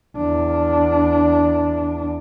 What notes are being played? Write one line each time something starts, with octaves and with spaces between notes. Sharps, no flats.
E2 D4